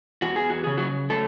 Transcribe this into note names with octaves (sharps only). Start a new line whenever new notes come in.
E2 F#4
G#4
F#4
C#3 G#4
F#3 F#4
F#3 A3 A4